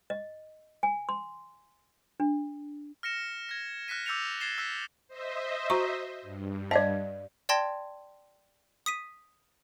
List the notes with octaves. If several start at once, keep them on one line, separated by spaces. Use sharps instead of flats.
D#5
G#5
C6
D4
F6 A#6 C#7 E7
G#6 A#6
F6 F#6 A#6 B6 D#7
D6 E6 G6 A6 C#7 F7
G#6 A6 C7 E7 G7
E6 F#6 B6
C5 D#5 E5
F#4 A#5 C#6
G2
D5 D#5 F5 A5
D5 G5 A5 C6 G#6 A#6
D#6 B6 D#7